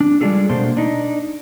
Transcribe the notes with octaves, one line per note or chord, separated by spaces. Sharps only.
D4
G3 G#3 D4 F4 G#4 A4
B2 A3 A#3 D4 A4 C5
D4 D#4